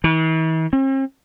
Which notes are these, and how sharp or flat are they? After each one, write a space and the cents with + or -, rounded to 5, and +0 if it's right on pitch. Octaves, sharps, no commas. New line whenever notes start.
E3 -45
C4 +45